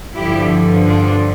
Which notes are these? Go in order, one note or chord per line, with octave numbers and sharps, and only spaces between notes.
G2 D3 F3 E4 G4
D4 F4